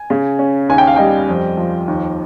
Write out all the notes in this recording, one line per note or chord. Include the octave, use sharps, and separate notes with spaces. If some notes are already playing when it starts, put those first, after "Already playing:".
Already playing: G#5
C#3
C#4
D#2 G#5
G5
F5
G3 D#5 G5
F2
F3
D#2